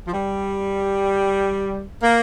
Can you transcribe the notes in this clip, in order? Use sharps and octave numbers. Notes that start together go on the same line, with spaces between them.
F3
G3
A#3